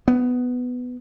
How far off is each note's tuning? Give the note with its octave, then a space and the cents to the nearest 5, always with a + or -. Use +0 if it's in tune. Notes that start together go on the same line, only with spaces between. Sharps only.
B3 +10